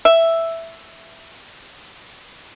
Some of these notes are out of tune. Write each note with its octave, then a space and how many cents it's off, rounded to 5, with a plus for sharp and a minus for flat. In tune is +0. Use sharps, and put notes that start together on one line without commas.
E5 +0